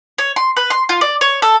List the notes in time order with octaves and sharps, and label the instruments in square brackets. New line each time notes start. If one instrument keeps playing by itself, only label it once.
[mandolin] C#5
C6
B4
C6
F4
D5
C#5
A4